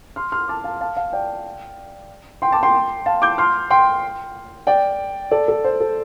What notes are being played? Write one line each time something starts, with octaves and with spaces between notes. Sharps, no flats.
C6 F6
C6 F6
A5 D6
F5 A5
F5 A5
F5 A5
D5 G5
G5 C6
A5 D6
G5 C6
F5 A5
D6 G6
C6 F6
G5 C6
D5 G5
A4 D5
A4
C5
A4